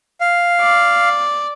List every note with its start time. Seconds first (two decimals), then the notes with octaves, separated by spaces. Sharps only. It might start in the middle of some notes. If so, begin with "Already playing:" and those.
0.21 F5
0.60 D5